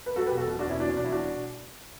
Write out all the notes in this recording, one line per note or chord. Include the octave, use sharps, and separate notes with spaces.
B4
F#3 F#4 A4
G4 B4
E1
F#4 A4
B2
D4 F#4
E2
C#4 E4
F#3 D4
C#4
E1 D4
C#4 E4
B2 D4 F#4